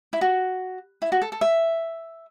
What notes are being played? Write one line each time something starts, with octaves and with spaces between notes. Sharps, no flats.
E4
F#4
E4
F#4
A4
A4
E5